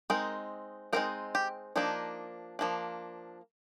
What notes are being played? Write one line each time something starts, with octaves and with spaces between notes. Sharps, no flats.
G#3 C4 D#4 A#4
G#3 C4 D#4 A#4
G4
F3 A#3 D4 D#4
F3 A#3 D4